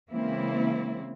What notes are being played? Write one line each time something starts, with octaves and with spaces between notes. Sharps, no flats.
C#3 E3 G#3 A#3 C4 E4